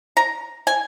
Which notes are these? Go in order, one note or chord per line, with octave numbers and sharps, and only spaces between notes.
A#5
G#5